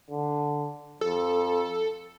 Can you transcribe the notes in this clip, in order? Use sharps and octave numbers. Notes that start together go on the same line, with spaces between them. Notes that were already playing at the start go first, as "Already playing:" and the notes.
D3
F2 A4